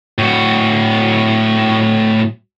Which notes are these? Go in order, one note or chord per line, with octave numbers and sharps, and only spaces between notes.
A2 F#4